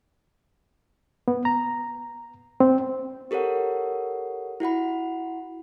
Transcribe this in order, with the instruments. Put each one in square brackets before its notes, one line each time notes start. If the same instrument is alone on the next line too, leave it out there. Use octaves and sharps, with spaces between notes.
[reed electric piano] B3
A#5
C4
[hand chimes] G4 A4 A#4 C#5 F#5
E4 F#4 F#5 B5